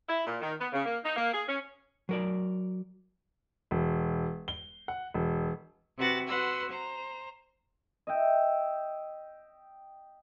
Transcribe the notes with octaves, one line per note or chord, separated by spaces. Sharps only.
E4
A#2
D#3
B3
C#3
A#3
D#4
A#3
G#4
C#4
F#3 A#4 D5
E1
G7
F#5
E1
C3 F#4 B4 F#6 A6 A#6
F#4 B4 F#5 C6 E6
C5 A#5
D#5 E5 G5